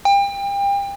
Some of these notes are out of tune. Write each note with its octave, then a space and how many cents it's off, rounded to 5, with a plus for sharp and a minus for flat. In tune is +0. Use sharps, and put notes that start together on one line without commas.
G5 +30